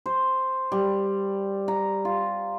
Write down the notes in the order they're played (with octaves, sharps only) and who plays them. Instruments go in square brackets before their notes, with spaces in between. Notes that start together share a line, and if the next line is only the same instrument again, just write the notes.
[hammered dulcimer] C5
G3
A#5
F4